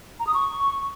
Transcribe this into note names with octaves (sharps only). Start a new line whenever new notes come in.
A#5
D#6
C#6